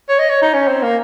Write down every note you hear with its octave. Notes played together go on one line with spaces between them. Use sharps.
C#5
D#5
C#5
D#4
C#4
C4
A#3